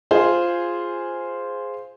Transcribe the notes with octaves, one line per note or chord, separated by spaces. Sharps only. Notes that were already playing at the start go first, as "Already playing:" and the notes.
F4 G#4 C5